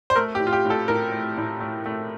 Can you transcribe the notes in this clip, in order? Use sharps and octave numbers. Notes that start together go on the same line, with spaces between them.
C5
A3 A#4
G4
A2
F4
G4
A2
A4
A2 A#4
A3
A2
A3
A3